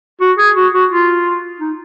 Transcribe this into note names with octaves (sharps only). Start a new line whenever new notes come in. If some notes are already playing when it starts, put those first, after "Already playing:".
F#4
G#4
F#4
F#4
F4
D#4